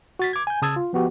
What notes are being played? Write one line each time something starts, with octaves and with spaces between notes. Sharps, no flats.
F#4 A6 B6
D6 G#6
G#5 G6
C#3 A5 D#6 E6 G#6 A6
F4
F3 B3 F#4 G4